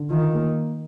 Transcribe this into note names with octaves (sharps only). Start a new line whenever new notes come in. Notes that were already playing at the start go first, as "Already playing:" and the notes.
Already playing: D3
D#3 F4
A#3